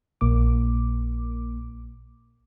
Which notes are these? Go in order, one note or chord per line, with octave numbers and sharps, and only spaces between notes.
A#1 A#3 D6